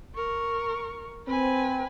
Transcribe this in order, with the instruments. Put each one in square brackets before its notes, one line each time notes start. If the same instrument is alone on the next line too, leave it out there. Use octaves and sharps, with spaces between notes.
[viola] A#4 C#6
[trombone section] C4 [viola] B4 G#5